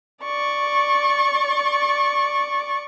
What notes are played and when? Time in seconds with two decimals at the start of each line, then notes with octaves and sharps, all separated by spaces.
0.23 D5 C#6